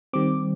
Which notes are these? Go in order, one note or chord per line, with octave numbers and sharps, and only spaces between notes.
D#3 G3 C4 D6